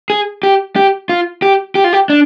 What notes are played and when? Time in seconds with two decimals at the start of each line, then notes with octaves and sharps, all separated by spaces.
0.10 G#4
0.43 G4
0.76 G4
1.09 F4
1.42 G4
1.75 G4
1.84 F4
1.93 G4
2.10 D4